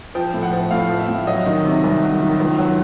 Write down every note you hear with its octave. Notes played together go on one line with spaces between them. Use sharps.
F3 G5
A2
F#5
F3
A2 F5
F3
E5
A2
F#3 D#5
D#3
C3
C2
F#3
D#3
C#2
F#3